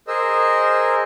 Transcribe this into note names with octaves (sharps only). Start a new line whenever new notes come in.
G#4 A#4 C5 D#5 E6